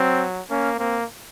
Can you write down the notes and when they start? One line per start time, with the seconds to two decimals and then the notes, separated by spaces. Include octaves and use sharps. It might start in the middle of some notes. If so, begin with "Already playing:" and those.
Already playing: F#3 C4
0.50 A#3 C#4
0.78 A#3 C4